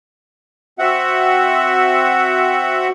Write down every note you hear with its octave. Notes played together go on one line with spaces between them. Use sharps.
C4 F#4 E5 F#5